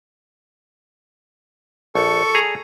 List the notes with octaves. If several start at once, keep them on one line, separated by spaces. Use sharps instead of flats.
A#1 A4 C#6
G#4 A#5